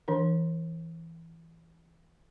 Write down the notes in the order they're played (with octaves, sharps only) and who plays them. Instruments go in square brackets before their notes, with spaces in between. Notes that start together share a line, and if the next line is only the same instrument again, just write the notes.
[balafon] E3 D4 A#4